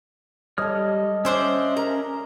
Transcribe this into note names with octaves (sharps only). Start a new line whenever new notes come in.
G3 A4 C#5 D#5 F6
C#4 D4 C5 E5
A#4 A#5